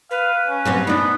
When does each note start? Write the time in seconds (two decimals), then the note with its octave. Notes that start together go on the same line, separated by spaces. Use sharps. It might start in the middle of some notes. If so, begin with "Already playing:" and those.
0.11 B4 F5
0.48 C#4
0.65 G2 F#3 C4
0.87 B3 D4 D#4